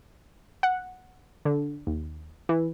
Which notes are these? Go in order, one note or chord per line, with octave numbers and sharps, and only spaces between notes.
F#5
D3
D#2
E3